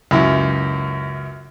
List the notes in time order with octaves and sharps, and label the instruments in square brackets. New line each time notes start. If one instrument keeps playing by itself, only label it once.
[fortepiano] C#2 F#2 E4